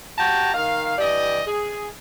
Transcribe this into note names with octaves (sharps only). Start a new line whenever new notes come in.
F#4 G4 G5 A5 A#5
D#3 F5
G2 E3 G4 D5 D#5
G#4